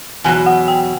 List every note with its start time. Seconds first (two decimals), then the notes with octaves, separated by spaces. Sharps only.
0.24 E2 B2 F#3 G#5
0.46 F#5
0.68 G5